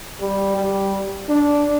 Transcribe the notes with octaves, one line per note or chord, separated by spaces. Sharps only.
G3
G3
D4